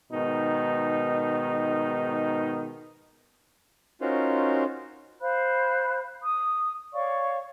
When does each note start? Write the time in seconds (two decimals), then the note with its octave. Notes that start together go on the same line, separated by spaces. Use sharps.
0.12 G#2 B2 D#3 D#4
4.01 C#4 D#4 F4 F#4 A#4 C5
5.21 C5 F5 B5 F#6
6.24 D#6
6.93 C#5 D5 F5 C#6